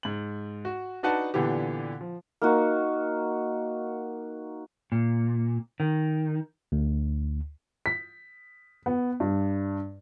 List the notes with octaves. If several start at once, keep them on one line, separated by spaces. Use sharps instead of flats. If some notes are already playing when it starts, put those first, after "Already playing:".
G#2 F#7
F#4
D4 D#4 F#4 B4 F#5 A5
A#2 D3 E3 B3 G4
F3
A#3 D#4 F#4
A#2
D#3
D2
B6
B3
G2